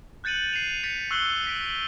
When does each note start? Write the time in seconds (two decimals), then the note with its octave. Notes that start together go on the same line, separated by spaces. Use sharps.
0.24 F#6 G6 A6 C#7 D#7 F#7
0.53 C7 C#7 D#7 F7
0.83 G6 A6 B6 C#7
1.10 C#6 E6 F#6 C7 G7
1.47 B6 D7